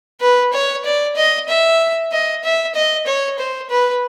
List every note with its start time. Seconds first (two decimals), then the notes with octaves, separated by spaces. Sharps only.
0.21 B4
0.53 C#5
0.85 D5
1.16 D#5
1.48 E5
2.12 D#5
2.43 E5
2.74 D#5
3.06 C#5
3.38 C5
3.70 B4